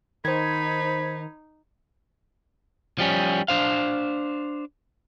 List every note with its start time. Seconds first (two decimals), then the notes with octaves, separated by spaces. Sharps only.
0.25 D#3 D#4 C5 B5 G#6
2.98 F3 G3 C#4
3.48 D4 C5 F5